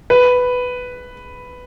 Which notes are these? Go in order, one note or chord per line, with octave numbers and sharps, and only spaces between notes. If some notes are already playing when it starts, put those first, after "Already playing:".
B4